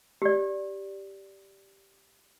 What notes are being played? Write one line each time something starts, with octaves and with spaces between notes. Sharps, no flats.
G4 D5